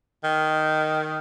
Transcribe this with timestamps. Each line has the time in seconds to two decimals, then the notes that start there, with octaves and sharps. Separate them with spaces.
0.24 D#3